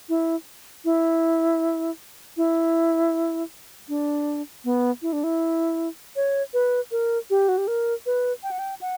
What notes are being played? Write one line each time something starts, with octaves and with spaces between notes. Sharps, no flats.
E4
E4
E4
D4
B3
E4
D4
E4
C#5
B4
A#4
G4
F#4
G4
A#4
B4
G5
F#5
G5
F#5